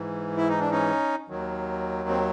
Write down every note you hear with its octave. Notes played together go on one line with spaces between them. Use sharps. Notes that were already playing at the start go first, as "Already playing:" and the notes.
Already playing: G#2 E3
E4
D#4
D4
C#4 D#4
D#2 D#3 F#3
C4